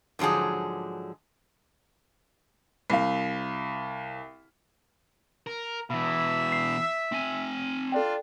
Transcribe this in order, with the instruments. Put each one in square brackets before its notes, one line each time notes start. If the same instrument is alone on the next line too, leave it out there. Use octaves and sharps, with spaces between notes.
[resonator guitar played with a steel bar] G#2 D3 F3 F#3 G#4
[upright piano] C2 F5
[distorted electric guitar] A#4
[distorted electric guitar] B2 E3 [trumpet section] E5 [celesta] B5
[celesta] C7
[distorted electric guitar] C4 G#5
[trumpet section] D4 F4 [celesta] A4 D5 G5